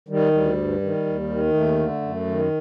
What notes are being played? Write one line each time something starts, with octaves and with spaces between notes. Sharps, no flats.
D#3 G3
D2 G3
G2
D#3
D#2
D#3
D#2 A3
D3
F#2
D#3